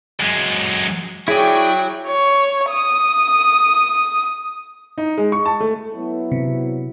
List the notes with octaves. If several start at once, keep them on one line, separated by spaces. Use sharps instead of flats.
F#2 G#3
E4 F#4 G#4 C#5 D5 G5 C#6
C#5
D#6
D#4
G#3
C#6
A5
A3
F#3 B3 E4
C3